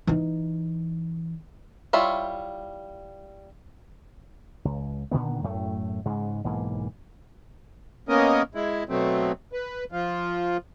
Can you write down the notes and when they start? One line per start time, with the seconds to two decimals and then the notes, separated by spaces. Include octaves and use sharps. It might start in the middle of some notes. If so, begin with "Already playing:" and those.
0.07 E3 D#4
1.93 G3 E4 F4 C#5 E5
4.65 C#2
5.11 A#2 D3 D#3 B3
5.43 F#2 A2 A3
6.06 G#2 C#3 G#3
6.44 B1 G#2 E3 A#3
8.09 A#3 B3 C#4 A#4 D#5
8.55 G#3 E4
8.89 B2 F#3 A3 C4
9.53 B4
9.92 F3 F4